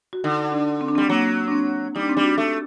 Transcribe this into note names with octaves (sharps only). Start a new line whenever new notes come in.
F#4
D3 D#4
D4
C4
D4
C4
G3
F#3 A#3
D4
C4
G3 D#4
D4
C4
G3 D4
F#4
A3